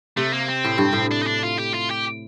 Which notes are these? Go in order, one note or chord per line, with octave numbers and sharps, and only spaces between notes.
C3 A3
A#3
C4
A2
G2
A2
D4
D#4
D4
F4
G4
F4
G4